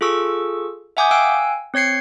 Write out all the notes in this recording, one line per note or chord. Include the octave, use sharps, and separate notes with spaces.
F4 G#4 A4 C#6 E6
E5 F#5 G#5 D6 D#6 G6
F5 G5 G#5 E6 F#6 D7
C4 C#5 G#6 C7 C#7